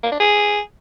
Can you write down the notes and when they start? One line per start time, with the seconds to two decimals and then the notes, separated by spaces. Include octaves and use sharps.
0.03 A#3
0.12 D4
0.20 G#4